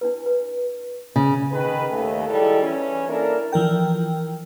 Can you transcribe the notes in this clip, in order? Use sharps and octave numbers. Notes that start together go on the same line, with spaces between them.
D4 E4 B4
B4
C#3 D#6
D#3 G#4 B4
D#2 A3
D#3 G3 G#3 E4 A4
E3 C#4
A#3 D4 E4 A4 A#4
E3 F3 A#4 G5